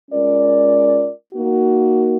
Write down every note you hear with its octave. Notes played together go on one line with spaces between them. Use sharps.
G#3 C#4 F4 A#4 D5
A#3 D#4 F#4